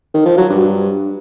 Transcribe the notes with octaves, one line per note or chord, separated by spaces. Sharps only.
D#3
F3
F#3
G2